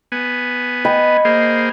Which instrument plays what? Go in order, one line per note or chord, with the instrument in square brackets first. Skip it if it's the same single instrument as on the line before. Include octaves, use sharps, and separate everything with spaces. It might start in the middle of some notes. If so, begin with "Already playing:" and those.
[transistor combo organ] B3 G#5
[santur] D#5 G5 B5
[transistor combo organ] A#3 G#4 C5